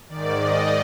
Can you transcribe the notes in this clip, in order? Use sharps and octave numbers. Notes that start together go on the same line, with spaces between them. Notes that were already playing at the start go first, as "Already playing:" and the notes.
G#2 D#3 D5
D#5